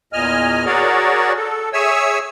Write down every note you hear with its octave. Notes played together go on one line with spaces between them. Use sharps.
E2 A#2 D#5 G#5 F6
F#4 G#4 A#4 C#5 D5
A4
G#4 C#5 E5 G#5 E6